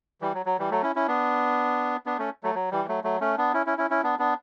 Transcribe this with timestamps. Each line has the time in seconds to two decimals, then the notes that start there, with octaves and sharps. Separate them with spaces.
0.21 E3 G3
0.34 F#3
0.46 F#3
0.59 E3 G3
0.71 F#3 A3
0.83 C#4 E4
0.96 C#4 E4
1.08 B3 D4
2.06 B3 D4
2.19 A3 C#4
2.43 F#3 A3
2.55 F#3
2.71 E3 G3
2.88 F#3 A3
3.04 F#3 A3
3.21 A3 C#4
3.38 B3 D4
3.54 C#4 E4
3.66 C#4 E4
3.78 C#4 E4
3.90 C#4 E4
4.04 B3 D4
4.19 B3 D4